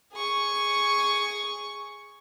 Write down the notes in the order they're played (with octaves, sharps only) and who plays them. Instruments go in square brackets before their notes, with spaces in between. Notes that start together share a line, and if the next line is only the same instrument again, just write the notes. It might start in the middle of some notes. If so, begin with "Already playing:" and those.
[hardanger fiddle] G#4 C#6